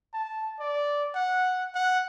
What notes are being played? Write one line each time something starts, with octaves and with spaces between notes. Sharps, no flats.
A5
D5
F#5
F#5